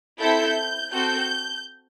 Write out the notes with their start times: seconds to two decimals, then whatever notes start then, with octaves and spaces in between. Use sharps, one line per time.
0.21 C4 E4 A4 G6
0.92 C4 F#4 A4 G6